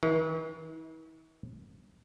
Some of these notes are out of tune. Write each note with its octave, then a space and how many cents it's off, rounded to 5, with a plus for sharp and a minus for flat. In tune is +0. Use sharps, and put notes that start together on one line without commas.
E3 -45